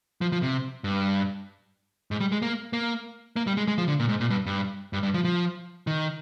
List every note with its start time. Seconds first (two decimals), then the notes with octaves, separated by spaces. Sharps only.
0.21 F3
0.32 F3
0.43 C3
0.84 G2
2.11 G#2
2.20 G3
2.32 G#3
2.42 A#3
2.73 A#3
3.36 A#3
3.47 G3
3.57 G#3
3.68 G#3
3.78 F3
3.88 D3
4.00 A#2
4.09 G#2
4.20 A#2
4.30 G2
4.46 G2
4.93 G2
5.03 G2
5.14 F3
5.24 F3
5.87 D#3